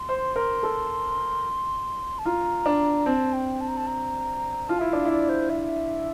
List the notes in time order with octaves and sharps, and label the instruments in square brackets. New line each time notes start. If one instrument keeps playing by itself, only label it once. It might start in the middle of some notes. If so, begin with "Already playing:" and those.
Already playing: [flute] C6
[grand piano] C5
A#4
A4
[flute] A5
[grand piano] F4 [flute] A#5
[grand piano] D4
[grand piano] C4 [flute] A5
[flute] G5
A5
A#5
A5
A#5
[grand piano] F4 [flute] A5
[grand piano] E4 [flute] E5
[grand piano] D4 [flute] F5
[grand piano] E4 [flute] D5
[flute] C5
E5